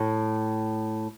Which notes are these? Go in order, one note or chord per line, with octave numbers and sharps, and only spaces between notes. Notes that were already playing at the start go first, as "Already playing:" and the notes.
Already playing: A2